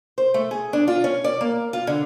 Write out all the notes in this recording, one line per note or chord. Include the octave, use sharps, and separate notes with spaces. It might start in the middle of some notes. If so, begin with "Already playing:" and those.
C5
A3
G#4
D4
F4
C#4
D5
A#3
F4
D3